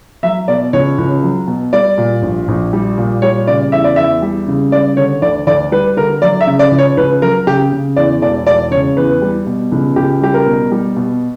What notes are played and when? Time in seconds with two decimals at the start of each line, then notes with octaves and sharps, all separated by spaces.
0.23 F#3 E5
0.48 B2 D5
0.73 C#2 C#5
0.98 C#2
1.23 F#3
1.47 B2
1.73 G3 D5
1.98 A#2
2.22 A#1
2.48 A#1
2.73 G3
2.98 A#2
3.22 G3 C#5
3.47 C#3 D5
3.72 E2 E5
3.84 D5
3.96 E2 E5
4.22 G3
4.48 C#3
4.72 G3 D5
4.97 D3 C#5
5.22 D2 D5
5.47 D2 D5
5.72 G3 B4
5.97 D3 A#4
6.22 F#3 D5
6.41 E5
6.47 C#3
6.59 D5
6.71 C#2
6.78 C#5
6.97 C#2 B4
7.22 F#3 A#4
7.46 C#3 G4
7.72 C#3
7.96 E2 D5
8.22 E1 D5
8.47 E1 D5
8.71 C#3 C#5
8.97 E2 B4
9.22 G3
9.46 B2
9.72 C#2
9.96 C#2 G4
10.22 G3 G4
10.34 A#4
10.47 B2
10.72 G3
10.96 B2